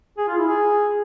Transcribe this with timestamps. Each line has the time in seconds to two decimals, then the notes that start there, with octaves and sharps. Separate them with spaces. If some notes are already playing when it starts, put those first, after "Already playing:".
0.18 G#4
0.28 F4
0.38 E4
0.48 G#4